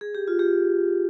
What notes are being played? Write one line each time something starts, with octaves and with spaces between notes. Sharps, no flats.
G#4
G4
F4
G4